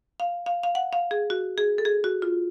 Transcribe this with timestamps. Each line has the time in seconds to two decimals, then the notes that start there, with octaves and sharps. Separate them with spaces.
0.20 F5
0.46 F5
0.63 F5
0.75 F#5
0.93 F5
1.11 G#4
1.30 F#4
1.58 G#4
1.78 A4
1.85 G#4
2.04 F#4
2.22 F4